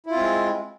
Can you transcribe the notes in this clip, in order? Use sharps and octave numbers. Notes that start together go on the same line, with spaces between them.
G#3 C4 E4 F4